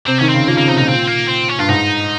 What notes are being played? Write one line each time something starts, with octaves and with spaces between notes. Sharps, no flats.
C3 C4
D#3 C#4
C#3 C4
F3 A#3
C#3 A#3
C3 D#4
A#2 D#4
C4
A#3
C4
C#4
G2 F4
G#2 D#4